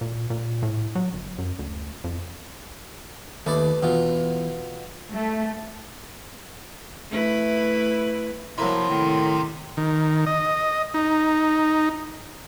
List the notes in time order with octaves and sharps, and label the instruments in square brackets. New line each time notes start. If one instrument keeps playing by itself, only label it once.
[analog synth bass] A#2
A#2
A2
F#3
G1
F#2
D2
F2
[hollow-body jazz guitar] D#2 [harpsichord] A3 B4 D5
[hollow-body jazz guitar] E2 [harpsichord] B2 F4
[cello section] A3
[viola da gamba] A3 E4 B4
[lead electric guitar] C3 [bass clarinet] F3 [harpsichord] F#3 A#3 E4
[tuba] A2 [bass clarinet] D#3
[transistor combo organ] D#3
D#5
D#4